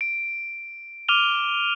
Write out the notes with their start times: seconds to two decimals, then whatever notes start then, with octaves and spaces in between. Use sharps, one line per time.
0.01 D7
1.08 D6 F6 D#7 F7 G7